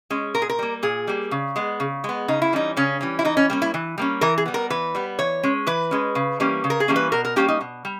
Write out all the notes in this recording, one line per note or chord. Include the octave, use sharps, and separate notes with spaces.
G#3 C#4
A#2 A#4
G#4
A#4
G3 A#3
A#2 G#4
G3 A#3
C#3
G#3 B3
C#3
G#3 B3
C#3 D#4
E4
E3 G3 C#4 D#4
C#3 C#4
E3 G3 C#4
E4
E3 D#4
C#4
G3 A#3 C#4
E4
E3
G3 A#3 C#4
E3 A#4
G#4
G3 B3
A#4
E3 B4
G3 B3
E3 C#5
G#3 C#4
E3 B4
G#3 C#4
C#3
E3 G3 A#3 C#4
C#3
A#4
G#4
E3 G3 A#3 C#4
B4
B2 A#4
A#4
G3 A#3 C#4 G4
D#4
B2
G3